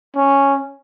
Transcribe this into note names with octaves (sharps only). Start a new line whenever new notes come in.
C#4